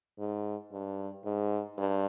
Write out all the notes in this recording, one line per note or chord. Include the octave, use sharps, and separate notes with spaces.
G#2
G2
G#2
G2